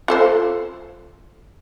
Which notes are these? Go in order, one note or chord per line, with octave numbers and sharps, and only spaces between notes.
F4 A4 C5